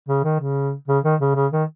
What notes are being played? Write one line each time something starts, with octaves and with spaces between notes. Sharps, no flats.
C#3
D#3
C#3
C#3
D#3
C#3
C#3
D#3